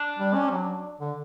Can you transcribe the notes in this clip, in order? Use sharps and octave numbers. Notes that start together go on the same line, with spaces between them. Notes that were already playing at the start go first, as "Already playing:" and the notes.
Already playing: D4
G3
C#4
F#3
D3